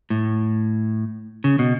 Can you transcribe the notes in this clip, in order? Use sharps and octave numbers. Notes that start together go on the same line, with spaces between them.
A2
C#3
B2